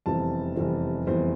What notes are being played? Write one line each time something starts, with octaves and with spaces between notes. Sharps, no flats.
F1 E2 E3 G3 C4 A5
F1 E2 E3 G3 C4
F1 E2 E3 G3 C4 C5